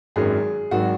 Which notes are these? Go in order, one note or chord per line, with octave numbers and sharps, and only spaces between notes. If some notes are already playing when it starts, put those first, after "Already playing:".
G#1 F#2 D#3 F#3 G#4
G#1 D#3 F#3 F#4